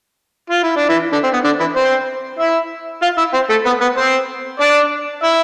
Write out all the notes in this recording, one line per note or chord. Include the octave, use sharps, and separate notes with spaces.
F4
E4
D4
E3 E4
D3 D4
C4
B3
D3 D4
E3 E4
C4 C5
E4 E5
F4 F5
E4 E5
C4 C5
A3 A4
B3 B4
B3 B4
C4 C5
D4 D5
E4 E5